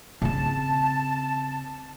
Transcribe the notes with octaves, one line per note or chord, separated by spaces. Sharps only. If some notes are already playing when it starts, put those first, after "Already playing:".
C#3 C4 A5